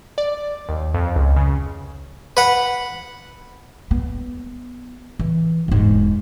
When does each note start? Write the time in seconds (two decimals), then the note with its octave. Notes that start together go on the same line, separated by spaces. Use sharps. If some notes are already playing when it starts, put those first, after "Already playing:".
0.18 D5
0.69 D#2
0.94 F2
1.16 C#2
1.36 C#3
2.37 B4 F#5
3.91 B3
5.19 E3
5.68 E1 G#2